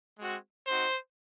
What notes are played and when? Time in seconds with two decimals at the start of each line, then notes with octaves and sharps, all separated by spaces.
0.18 G#3 C4 F#4
0.68 C4 D#4 F#4 C5